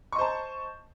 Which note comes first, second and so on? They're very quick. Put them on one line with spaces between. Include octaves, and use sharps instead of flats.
C#6 D#5 C5 A5